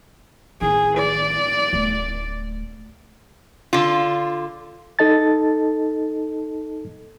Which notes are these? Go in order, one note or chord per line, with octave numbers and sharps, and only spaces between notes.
A1 D#3 G#4
D5
D1 A3
D3 F4
D#4 A4 D#5 A5 A6